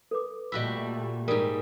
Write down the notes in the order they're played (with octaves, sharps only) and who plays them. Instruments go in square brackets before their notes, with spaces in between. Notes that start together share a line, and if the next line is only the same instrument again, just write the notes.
[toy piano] A4 B4 D6
[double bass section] A#2 A3 [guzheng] G3 F#4 E5 [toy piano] D#5 G5 B5
[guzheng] G#2 G3 [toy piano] A#4 D5 D#6